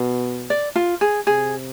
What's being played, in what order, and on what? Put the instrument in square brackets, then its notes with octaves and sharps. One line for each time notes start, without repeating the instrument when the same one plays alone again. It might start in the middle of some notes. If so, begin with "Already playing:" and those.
Already playing: [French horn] B2
[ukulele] D5
F4
G#4
[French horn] C3 [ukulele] G#4